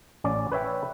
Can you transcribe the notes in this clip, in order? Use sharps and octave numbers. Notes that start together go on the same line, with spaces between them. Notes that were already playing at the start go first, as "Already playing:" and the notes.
A1 C#4 D5
B4 C#5 E5 G5